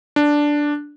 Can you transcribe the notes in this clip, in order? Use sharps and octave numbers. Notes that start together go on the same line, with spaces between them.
D4